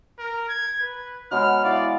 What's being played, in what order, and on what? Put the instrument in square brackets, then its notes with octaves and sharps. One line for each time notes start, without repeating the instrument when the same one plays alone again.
[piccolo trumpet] A#4
G#6
B4
[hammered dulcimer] F#3 G#3 B3 [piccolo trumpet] F6
[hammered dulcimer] E3 F5 [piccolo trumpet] D5